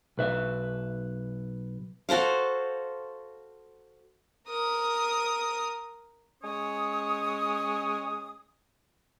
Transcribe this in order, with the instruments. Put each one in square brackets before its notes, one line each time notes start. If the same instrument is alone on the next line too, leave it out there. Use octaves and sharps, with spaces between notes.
[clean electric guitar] B1 B4 E5
[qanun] F#4 A4 C5 F5
[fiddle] A#4 D#6
[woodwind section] G#3 C#4 C#5 D#6